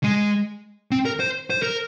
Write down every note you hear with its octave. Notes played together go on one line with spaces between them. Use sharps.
G#3
C4
A#4
C5
C5
A#4